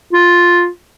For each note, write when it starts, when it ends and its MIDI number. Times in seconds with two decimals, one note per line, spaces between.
0.13 0.68 65